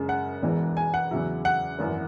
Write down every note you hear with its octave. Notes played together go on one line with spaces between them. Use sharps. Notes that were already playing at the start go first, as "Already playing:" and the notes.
Already playing: F#2 C#3 G#3 C#4
F#5
E1 E2 E3 G#3
G#5
F#5
E2 C#3 F#3 E4
F#5
G#1 F#2 E3